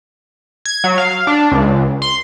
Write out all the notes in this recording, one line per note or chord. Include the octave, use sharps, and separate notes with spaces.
G#6
F#3
F5
D4
C#2
C6